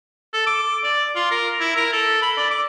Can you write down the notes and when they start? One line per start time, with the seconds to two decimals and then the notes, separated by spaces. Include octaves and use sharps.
0.33 A4
0.46 D6
0.84 D5
1.15 F4
1.31 A#4
1.60 E4
1.76 A#4
1.92 A4
2.22 B5
2.37 D5
2.50 D6